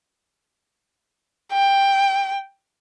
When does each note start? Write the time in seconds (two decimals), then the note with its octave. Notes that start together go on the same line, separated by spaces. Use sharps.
1.53 G5